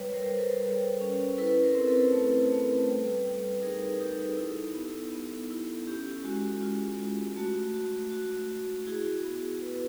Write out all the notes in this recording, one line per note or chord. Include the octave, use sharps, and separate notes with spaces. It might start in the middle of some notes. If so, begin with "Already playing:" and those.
Already playing: G3 B4 C#5
A#4 C5
G3
A4 B4
G3
C#4
E4 A4 B4
A#4 C5
C4
A4 B4
A3
A3
G3
G3
D#4 G#4 A#4
D#4 G4 A4
E4
B3
B3
E4
C#4 G4
G#3 F#4
F4
F4
A3 F#4
F#4
F#4
F#4
E4 F#4 G#4
B3
E4 A4 B4